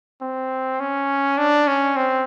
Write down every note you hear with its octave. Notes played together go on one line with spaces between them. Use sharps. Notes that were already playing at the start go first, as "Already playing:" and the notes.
C4
C#4
D4
C#4
C4